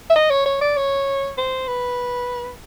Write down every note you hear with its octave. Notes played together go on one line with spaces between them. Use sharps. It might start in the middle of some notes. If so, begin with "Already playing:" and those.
E5
D#5
C#5
C#5
D5
C#5
C5
B4